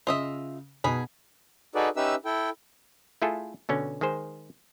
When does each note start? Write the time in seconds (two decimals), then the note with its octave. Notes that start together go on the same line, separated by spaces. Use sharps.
0.07 C#3 F4 D#5 E5
0.84 B2 D#4 G#4 B5
1.75 D#4 F#4 G#4 A4 B4 D5
1.97 C#4 D#4 G4 B4 E5 E6
2.25 E4 A4 G5
3.22 A3 E4 F4 G#4 A4
3.69 B2 D3 C#4
4.01 D#3 G#3 G#4 C5